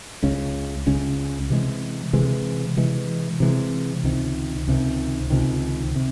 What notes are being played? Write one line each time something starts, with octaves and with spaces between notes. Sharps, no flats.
C#2 C#3 G#3 C#4
C#2 C#3 G#3 C#4
C3 E3 G#3
C3 E3 G#3
C3 E3 G#3
C3 E3 G#3
C#2 C3 D#3
C#2 C3 D#3
C#2 C3 D#3
C3